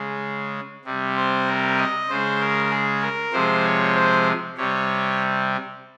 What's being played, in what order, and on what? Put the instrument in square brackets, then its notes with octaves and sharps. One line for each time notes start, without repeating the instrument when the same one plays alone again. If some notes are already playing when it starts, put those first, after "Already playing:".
Already playing: [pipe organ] C#3 G#3
C3 G3
C5
A#4
D#5
C#3 G#3 C5
A#4
G#4
A#4
C3 F3 G#3 C5
C#5
C5
C3 G3 C#5